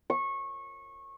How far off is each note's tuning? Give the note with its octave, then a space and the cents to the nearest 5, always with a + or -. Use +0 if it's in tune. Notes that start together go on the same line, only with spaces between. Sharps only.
C#6 -20